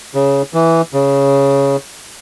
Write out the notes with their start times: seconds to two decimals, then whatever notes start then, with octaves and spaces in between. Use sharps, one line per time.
0.15 C#3
0.54 E3
0.93 C#3